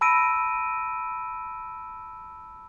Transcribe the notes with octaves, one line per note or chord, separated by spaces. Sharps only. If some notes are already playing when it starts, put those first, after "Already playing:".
A5 B5 E6 A#6 D7 D#7